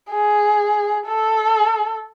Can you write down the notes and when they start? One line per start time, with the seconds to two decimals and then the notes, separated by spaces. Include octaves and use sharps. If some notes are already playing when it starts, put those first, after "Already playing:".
0.11 G#4
1.07 A4